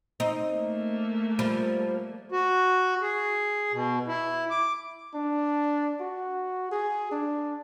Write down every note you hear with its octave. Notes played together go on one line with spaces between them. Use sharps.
C4 D#4
A3 A#3
F3 G3
F#4
G#4
B2
E4
D6
D4
F#4
G#4
D4